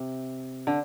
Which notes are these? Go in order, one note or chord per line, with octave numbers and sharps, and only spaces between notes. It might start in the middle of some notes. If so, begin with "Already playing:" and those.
Already playing: C3
D3